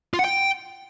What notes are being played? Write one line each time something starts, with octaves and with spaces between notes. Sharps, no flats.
F4
F#5
G5